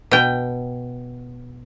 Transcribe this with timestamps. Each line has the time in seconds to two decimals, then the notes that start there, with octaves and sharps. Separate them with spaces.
0.11 B2 G5